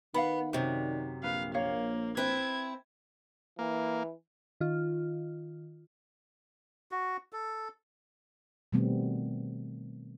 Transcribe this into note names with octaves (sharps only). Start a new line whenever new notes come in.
D#3 B3 F5 F#5 B5
F#2 C3 C5 D5
A#1 B4 F5
A#3 C#5 F5
C4 E4 B4 G#6
E3 A#3
D#3 F4
F#4
A4
B2 D#3 G3 A3 B3 C4